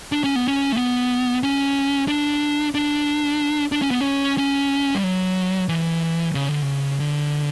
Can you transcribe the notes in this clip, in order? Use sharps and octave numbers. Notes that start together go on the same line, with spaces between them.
D4
C#4
B3
C#4
A3
B3
C#4
D4
D4
D4
C#4
B3
C#4
C#4
G3
F#3
E3
C#3
D3
C#3
D3